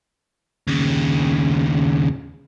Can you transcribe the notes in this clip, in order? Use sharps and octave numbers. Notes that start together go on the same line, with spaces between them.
D#2 C#3